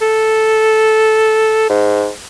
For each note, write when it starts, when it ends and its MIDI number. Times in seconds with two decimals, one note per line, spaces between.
0.01 1.68 69
1.69 2.09 44